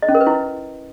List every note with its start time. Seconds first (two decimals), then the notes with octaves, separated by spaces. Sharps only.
0.02 D#5
0.09 C#4
0.15 A#4
0.21 B4
0.27 E4